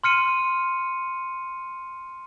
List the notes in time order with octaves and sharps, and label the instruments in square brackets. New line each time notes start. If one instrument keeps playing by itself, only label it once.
[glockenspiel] C6 F6 C#7 D#7